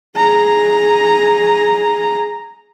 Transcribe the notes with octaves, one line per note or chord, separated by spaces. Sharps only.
G#4 A#5